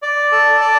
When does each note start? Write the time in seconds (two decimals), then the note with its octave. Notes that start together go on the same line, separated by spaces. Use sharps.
0.02 D5
0.32 A4
0.61 D5